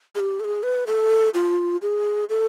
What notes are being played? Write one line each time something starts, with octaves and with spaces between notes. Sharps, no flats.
G#4
G4
A4
G#4
B4
A4
F4
G#4
A4